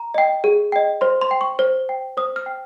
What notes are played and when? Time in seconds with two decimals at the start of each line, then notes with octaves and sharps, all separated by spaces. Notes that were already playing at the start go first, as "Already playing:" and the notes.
Already playing: A#5
0.14 D#5 G5
0.44 G#4
0.72 D#5 G5
1.01 C5 C6
1.21 C6
1.31 G5
1.41 C#6
1.59 C5
1.89 G5
2.17 C5 D#6
2.36 F6
2.46 G5